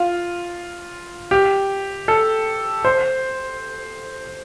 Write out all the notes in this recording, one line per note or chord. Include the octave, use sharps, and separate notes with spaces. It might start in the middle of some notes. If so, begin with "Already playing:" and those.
Already playing: F4
G4
A4
C5